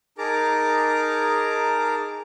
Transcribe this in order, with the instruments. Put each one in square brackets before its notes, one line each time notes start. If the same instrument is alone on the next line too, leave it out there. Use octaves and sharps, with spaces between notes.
[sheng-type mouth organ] D#4 G#4 A#4 A5 A#5 D6